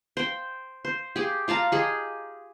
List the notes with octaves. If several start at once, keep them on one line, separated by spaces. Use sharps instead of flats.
C5 G5
C5
G4 G#4
F4 F5 A5 A#5
G4 G#4 D#5